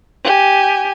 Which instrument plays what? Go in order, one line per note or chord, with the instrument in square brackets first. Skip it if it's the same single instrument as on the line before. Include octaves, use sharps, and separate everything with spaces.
[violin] G4 G#5